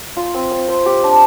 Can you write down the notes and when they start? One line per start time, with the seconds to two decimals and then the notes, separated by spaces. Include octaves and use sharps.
0.17 F4
0.34 C4
0.51 C4
0.68 C5
0.86 G4
1.04 D4